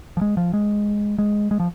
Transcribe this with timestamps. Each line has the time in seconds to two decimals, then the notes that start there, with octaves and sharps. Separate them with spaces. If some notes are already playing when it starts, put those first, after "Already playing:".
0.17 F3
0.21 G#3
0.37 F3
0.53 G#3
1.18 G#3
1.51 G#3
1.60 F3